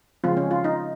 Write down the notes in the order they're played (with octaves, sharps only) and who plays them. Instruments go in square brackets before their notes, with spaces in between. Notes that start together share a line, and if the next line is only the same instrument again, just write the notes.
[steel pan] C#3 F3 G#3 C4 F4
C#4
F4
D#4